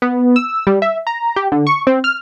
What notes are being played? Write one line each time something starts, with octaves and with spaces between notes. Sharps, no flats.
B3
E6
G3
E5
A#5
G4
D3
C#6
C4
F6